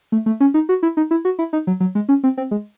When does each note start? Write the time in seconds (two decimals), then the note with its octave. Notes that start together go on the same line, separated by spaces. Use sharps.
0.12 A3
0.26 A3
0.40 C#4
0.54 D#4
0.69 F#4
0.83 E4
0.97 D#4
1.11 E4
1.25 F#4
1.39 E4
1.53 D#4
1.67 F#3
1.80 F#3
1.95 G#3
2.09 C#4
2.23 C4
2.37 C4
2.51 G#3